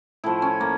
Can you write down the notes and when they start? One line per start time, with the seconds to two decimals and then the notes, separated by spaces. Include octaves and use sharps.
0.24 A2 F3 A3 E4
0.42 C#4
0.61 A#3